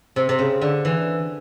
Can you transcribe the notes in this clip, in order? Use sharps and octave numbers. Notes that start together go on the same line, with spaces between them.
C3
C3
C#3
D3
E3